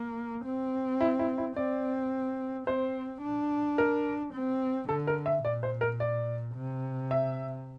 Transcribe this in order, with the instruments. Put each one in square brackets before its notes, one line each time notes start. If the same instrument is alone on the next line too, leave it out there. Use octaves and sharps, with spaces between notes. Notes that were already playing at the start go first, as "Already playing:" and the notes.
Already playing: [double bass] A#3
C4
[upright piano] E4
E4
E4
[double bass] C4 [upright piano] D5
[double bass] C4 [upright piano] C5
[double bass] D4
[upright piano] A#4
[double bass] C4
[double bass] D3 [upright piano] A4
[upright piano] A#4
E5
[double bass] A#2 [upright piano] D5
[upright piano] C5
A#4
D5
[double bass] C3
[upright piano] E5